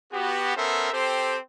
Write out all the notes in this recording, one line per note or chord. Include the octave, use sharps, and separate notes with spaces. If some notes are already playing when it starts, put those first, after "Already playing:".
B3 F#4 G4
B3 C#4 A4 A#4 C5 E5
C4 G4 A4 C5